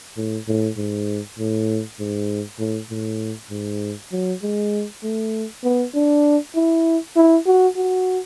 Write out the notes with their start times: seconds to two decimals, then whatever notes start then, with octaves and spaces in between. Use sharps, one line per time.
0.17 A2
0.48 A2
0.77 G#2
1.39 A2
2.00 G#2
2.59 A2
2.90 A2
3.50 G#2
4.12 F#3
4.42 G#3
5.03 A3
5.64 B3
5.95 D4
6.55 E4
7.16 E4
7.46 F#4
7.76 F#4